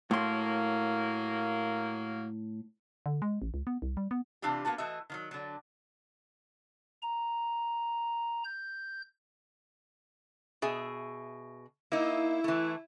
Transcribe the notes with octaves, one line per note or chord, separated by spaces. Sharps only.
A2 F#3 A#3 C6
D3
G#3
A1
C#2
B3
C2
G3
B3
C3 E3 D4 E4 F4 G4
A#3 B3 F#4 A5
E3 A3 F#4 D#5 E5
D#3 F3 F#3
D3 F#3
A#5
G6
B2 G#4 E5
A#3 D#4 E4
E3 A3